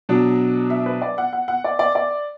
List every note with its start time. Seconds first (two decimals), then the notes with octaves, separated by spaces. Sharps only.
0.09 B2 F#3 D4
0.70 E5
0.86 B4
1.02 D5
1.18 F#5
1.33 F#5
1.48 F#5
1.64 D5
1.79 D5
1.95 D5